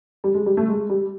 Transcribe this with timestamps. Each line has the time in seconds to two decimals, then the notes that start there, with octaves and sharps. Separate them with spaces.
0.24 G3
0.34 G#3
0.46 G3
0.57 A3
0.68 G#3
0.90 G3